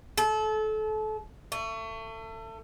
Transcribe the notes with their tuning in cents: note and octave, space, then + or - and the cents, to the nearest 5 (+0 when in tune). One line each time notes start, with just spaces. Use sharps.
A4 -30
A3 +30